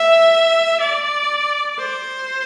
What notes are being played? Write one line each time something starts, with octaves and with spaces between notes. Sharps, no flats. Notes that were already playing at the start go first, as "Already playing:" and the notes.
Already playing: E5
D5
C5